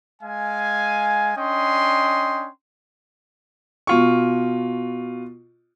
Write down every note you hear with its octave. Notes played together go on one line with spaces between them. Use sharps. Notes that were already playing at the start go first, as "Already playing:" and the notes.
G#3 F5 G#5
C#4 D4 D#5 G5 C6
B2 F4 C#6